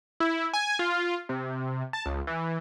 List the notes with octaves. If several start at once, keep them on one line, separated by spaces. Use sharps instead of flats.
E4
G#5
F4
C3
A5
C#2
E3